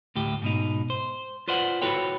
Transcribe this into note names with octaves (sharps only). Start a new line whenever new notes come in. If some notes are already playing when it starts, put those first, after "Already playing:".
D2 A2 G4
G#2 B2 D#4
C5
F4 B4 C5 D5 F#5
E4 F#4 A4 B4 C#5 G5